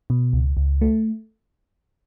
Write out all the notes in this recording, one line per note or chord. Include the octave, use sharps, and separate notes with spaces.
B2
C#2
C#2
A3